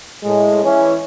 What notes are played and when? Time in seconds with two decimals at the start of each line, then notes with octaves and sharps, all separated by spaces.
0.24 A2 G#3
0.63 E3 C#4